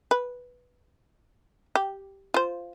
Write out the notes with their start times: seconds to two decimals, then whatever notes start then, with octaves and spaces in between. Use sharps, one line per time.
0.11 B4
1.75 G4
2.34 F4 C5